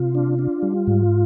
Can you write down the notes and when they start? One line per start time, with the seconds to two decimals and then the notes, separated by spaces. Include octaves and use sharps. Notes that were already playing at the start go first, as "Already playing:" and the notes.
Already playing: C3 F4
0.15 D4
0.39 D4
0.63 G3
0.87 G#2